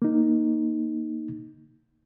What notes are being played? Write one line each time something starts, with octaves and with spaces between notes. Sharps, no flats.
A#3 D#4